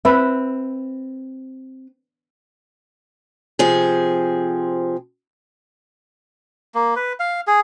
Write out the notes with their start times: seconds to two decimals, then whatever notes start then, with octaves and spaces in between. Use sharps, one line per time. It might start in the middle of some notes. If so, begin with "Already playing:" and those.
0.05 C4 B4 E5
3.59 C3 F3 C4 G#4
6.75 A#3
6.96 B4
7.20 F5
7.47 G#4